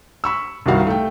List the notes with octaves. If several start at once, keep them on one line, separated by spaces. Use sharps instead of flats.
B5 C#6 E6
C2 G2 D#3 D#4 F#4 F5
A3 G5